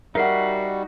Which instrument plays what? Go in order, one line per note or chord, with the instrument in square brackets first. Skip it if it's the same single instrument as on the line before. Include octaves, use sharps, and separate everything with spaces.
[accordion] G3 [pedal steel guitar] D#4 F#4 [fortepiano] A#4 F#5 [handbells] E5 C7